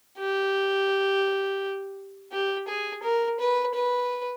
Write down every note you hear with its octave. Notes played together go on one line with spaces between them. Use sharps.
G4
G4
G#4
A#4
B4
B4